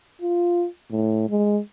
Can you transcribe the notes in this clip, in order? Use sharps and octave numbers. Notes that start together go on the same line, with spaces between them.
F4
A2
G#3